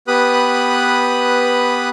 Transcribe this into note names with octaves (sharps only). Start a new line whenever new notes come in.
B3 G4 B4 B5 D#6 F#6